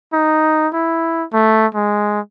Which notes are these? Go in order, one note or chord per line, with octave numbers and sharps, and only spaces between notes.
D#4
E4
A3
G#3